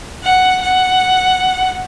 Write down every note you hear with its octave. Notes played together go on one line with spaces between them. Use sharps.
F#5
F#5